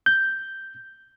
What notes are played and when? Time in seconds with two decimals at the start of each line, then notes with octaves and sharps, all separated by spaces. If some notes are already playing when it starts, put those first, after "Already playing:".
0.06 G6